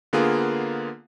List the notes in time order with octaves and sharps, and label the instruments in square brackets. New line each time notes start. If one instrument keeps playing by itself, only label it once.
[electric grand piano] D3 A#3 B3 F4 G#4